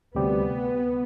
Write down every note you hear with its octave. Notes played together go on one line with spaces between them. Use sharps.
D2 C3 G3 B3 C4 G4